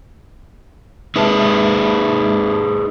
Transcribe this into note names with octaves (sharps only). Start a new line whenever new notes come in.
G#3 D#4 G#4 B4 E5 A5